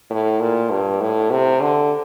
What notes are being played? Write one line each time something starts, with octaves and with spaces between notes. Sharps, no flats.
A2
A#2
G2
A2
C3
D3